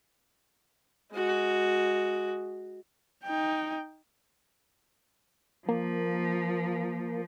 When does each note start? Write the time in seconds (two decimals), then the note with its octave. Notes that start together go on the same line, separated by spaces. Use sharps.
1.14 G#3 F#4
3.24 D#4 G5
5.69 F3 A#3